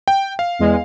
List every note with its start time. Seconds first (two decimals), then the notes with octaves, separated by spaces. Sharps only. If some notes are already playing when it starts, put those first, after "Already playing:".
0.08 G5
0.39 F5
0.59 E2 G#3